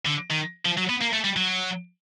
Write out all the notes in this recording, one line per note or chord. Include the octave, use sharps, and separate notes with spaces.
D3
D#3
F3
F#3
B3
A#3
A3
G3
F#3